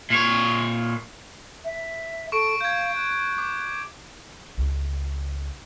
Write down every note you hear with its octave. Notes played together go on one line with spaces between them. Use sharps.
A#2 C#5
E5
A4 C#6 D7
F5 G6 G#6
F#6
D6
C#2